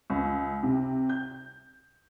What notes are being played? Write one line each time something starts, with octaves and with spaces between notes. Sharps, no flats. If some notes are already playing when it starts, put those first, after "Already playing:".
C#2
C3
G6